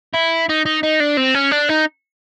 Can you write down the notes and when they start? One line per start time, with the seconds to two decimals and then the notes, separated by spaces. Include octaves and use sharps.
0.14 E4
0.49 D#4
0.66 D#4
0.83 D#4
1.00 D4
1.17 C4
1.35 C#4
1.52 D4
1.69 D#4